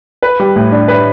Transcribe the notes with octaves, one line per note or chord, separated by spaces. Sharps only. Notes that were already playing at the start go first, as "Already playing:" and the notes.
B4
G3
A2
D4
B4